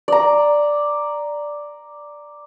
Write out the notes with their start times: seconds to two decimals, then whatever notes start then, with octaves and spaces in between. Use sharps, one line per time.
0.08 D5 A#5